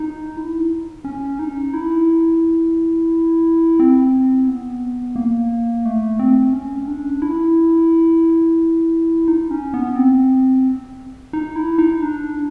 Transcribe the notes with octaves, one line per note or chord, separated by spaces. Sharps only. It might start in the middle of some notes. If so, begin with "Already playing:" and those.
Already playing: D#4
E4
C#4
D#4
E4
C4
B3
A#3
A3
C4
C#4
D4
E4
D#4
C#4
B3
C4
D#4
E4
D#4
D4